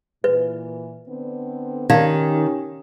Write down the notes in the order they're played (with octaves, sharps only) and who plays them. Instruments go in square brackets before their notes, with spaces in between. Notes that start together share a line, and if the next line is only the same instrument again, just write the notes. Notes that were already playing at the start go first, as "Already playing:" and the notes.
[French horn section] A#2 E3 [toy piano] B4
[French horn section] D3 B3 C4
[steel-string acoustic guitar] D#3 [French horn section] C#4 G4 [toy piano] D#4 D5 F5